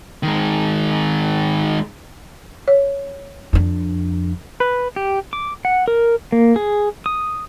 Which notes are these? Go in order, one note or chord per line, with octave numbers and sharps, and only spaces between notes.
D#3 G#3
C#5
F2 D4
B4
G4
D6
F#5
A#4
A#3
G#4
D#6